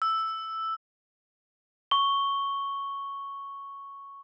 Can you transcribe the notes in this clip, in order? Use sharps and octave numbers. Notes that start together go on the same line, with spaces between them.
E6
C#6 G7